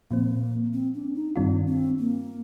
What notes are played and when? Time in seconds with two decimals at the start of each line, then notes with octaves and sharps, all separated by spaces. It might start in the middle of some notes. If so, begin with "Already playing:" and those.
0.10 A#2 F3 A#3 C4
0.73 C4
0.94 D4
1.15 D#4
1.35 G2 D#3 G3 C4 D4 F4
1.67 C4
1.99 A#3